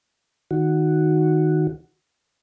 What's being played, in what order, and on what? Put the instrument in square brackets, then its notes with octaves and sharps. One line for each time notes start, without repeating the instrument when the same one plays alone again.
[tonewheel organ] D#3 F#4